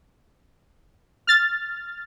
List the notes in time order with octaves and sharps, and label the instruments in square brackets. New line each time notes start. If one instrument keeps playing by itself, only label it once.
[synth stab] F6 A6